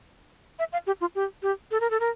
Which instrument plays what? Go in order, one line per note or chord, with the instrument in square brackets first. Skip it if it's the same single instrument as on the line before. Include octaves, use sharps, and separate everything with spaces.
[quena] E5
F5
G4
F4
G4
G4
A4
A#4
A4
A#4